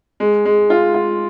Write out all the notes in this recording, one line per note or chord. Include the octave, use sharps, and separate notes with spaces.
G#3
G#3
F4
F4